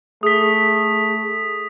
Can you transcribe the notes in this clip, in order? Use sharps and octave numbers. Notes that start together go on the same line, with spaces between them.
A3 G#4 D#6 B6